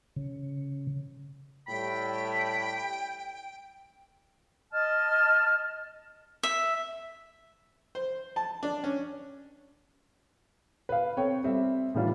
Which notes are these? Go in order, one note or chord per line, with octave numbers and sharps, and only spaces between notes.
C#3
A2 G3 G5 B5
D#5 A5 F6
E5
C5
A5
D4
C#4
B4 F5
C4 A4 C#5 G5
G3 C4 A4 E5
A2 D#3 E3 G3 D4 F4